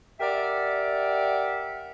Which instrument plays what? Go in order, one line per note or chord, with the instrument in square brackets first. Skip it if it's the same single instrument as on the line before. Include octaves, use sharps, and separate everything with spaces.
[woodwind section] G4 A#4 D5 E5 F#5